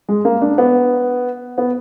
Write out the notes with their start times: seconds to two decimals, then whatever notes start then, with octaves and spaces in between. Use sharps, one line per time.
0.09 G#3
0.25 A#3
0.41 D4
0.58 B3
1.58 B3